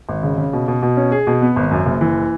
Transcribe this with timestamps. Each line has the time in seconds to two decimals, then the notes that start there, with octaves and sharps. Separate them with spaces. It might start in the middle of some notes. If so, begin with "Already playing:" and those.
0.09 G#1
0.23 C#3
0.38 C#3
0.53 B2
0.68 B2
0.83 B2
0.97 C#4
1.12 G#4
1.27 B2
1.42 B3
1.56 G#1
1.71 F#2
1.86 F#1
2.01 E3